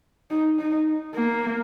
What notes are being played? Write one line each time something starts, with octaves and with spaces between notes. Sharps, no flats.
D#4
D#4
A#3